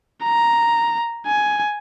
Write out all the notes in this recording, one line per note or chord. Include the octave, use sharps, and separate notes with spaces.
A#5
G#5